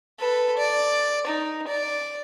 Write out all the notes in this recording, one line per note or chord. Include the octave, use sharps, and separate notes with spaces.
A4 B4
D5
D#4
D5